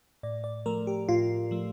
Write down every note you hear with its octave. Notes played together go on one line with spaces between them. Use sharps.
A2 D5
D5
F3 A3 A#4
G4
A2 F4
F3 A3